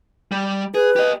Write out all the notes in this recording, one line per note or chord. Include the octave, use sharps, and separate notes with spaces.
G3
G#4 B4
G4 D#5